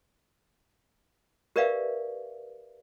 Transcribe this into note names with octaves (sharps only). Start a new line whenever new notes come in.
G4 A#4 B4 D5 E5 F5